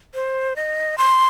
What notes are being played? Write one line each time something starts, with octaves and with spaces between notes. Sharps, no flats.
C5
D#5
C6